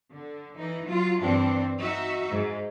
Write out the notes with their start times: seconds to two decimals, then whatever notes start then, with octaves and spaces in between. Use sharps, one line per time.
0.12 D3
0.56 E3 D#4
0.87 F#3 F4
1.20 G2 E3 G3 C4 D4
1.79 D#4 F#4 E5
2.31 G#2